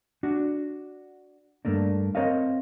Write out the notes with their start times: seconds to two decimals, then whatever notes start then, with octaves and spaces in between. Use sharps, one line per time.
0.23 D4 F#4
1.65 G2 A3 A#3 D4
2.15 C4 A#4 C#5 D#5 F5